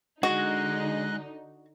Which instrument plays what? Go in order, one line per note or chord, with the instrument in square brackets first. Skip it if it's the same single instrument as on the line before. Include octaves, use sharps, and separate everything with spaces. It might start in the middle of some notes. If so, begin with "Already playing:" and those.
[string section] D3 D#4 [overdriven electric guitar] G#3 [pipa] F#4 [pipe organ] D#5 F#6